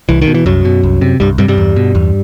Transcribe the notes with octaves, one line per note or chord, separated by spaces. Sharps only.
C2 E3
D#3
B2
E3
C2 F#2 F#3
B2
C2
C3
C2 G2 G3
G2 C3 G3
G2 G3
E2
B2
E2